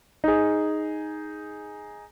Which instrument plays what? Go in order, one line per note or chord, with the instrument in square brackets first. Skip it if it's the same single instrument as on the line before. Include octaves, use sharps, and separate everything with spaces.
[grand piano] D#4 G#4